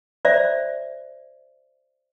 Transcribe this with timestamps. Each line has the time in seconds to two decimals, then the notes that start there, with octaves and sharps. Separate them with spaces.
0.25 C5 D5 E5